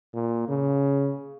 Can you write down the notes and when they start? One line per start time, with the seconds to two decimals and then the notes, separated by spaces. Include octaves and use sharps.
0.14 A#2
0.48 C#3